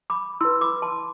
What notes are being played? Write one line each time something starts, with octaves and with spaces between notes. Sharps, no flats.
B5 D6
E4 B4 C6 E6
B5 D6
A5 C6